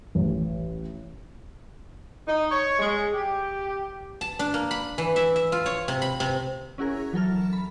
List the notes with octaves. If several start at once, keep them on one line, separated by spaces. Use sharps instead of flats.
A1
D#4
C#5
G#3
G4
A5
D4
A#3
B5
E3
E5
E5
F4
C#5
C3
B5
C3
C#4 E4 F#4 G#4 A#4
E3 F#3 A4 A#4 F6
B5